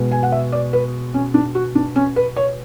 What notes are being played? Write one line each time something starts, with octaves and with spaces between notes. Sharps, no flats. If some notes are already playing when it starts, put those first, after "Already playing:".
Already playing: B2 G#3 B3
G#5
F#5
E5
D5
B4
C#4
D4
F#4
D4
C#4
B4
C#5